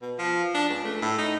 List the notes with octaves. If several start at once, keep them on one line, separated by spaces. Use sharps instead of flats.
B2
F3
D4
C#2
A3
A2
D#4